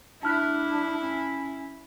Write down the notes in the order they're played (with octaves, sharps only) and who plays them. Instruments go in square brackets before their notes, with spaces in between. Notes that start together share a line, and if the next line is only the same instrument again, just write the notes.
[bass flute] D4 [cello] E4 [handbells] A5 F6 F#6
[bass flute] C#4